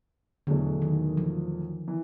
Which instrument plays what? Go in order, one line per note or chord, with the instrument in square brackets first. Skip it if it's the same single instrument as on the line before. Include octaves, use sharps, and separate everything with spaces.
[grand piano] E2 B2 F#3 A3 [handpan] D3
[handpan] D#3
F3
[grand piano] E3